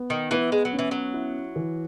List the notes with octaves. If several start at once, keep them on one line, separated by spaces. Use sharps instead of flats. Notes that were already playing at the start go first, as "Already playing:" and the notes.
Already playing: B3
D#3
E3 B3
G#3
F#3
C#4
E3
F#3
E4
E3